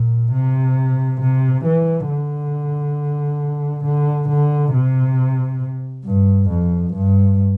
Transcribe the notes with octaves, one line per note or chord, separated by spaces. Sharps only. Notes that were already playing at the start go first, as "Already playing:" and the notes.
Already playing: A#2
C3
C3
E3
D3
D3
D3
C3
G2
F2
G2